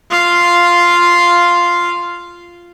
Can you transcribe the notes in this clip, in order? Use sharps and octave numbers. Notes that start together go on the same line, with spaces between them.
F4 F5